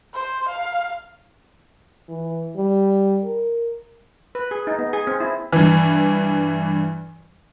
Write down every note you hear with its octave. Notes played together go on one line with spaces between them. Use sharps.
C5
F5
E3
G3
A#4
B4
G#4
D#4
B3
G#4
C4
E4
G2 E3